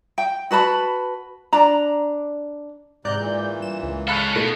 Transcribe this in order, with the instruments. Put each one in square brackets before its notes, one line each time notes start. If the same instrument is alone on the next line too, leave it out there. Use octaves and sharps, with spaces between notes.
[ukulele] G5
F#4 B4 A5 B5
D4 A#5
[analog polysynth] G#2 D5 G6 [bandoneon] C3 A#5 F#6
[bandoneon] A#2 E3
[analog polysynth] G2 E7
C#2
[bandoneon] G#3 [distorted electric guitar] A4 C#5 [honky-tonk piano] F5 B5 F#6
[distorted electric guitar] B2 [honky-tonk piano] A3 D#4 [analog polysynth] D#7